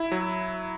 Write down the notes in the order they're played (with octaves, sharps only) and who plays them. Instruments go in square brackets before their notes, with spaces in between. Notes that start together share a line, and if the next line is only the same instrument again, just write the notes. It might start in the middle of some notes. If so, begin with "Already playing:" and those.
Already playing: [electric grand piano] E4
F#3